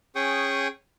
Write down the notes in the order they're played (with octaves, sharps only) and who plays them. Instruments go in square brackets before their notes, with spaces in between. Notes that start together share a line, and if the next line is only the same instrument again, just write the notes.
[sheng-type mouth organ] C#4 G#4 G5 C#6 D#6